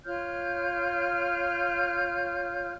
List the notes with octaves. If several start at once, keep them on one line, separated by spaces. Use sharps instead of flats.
F4 C#5 F6 G6